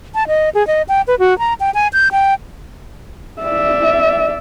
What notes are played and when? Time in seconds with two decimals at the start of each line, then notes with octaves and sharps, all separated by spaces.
0.15 A5
0.28 D#5
0.55 G#4
0.67 D#5
0.89 G5
1.08 B4
1.19 F#4
1.39 A#5
1.60 G5
1.74 G#5
1.93 G6
2.12 G5
3.41 D5 E5